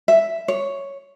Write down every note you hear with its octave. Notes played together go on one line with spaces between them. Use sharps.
E5
C#5